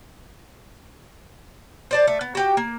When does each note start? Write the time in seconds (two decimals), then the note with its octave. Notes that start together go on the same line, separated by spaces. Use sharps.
1.91 C5 D5 A5
2.07 A3
2.21 B3
2.35 F#4 G4 G5
2.57 A#3